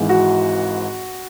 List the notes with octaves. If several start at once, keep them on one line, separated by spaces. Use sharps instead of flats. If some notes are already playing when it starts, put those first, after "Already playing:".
Already playing: G#1 G#2 E3 G#3
F#4